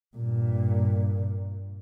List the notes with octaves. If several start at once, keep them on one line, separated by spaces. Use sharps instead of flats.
G2 A#2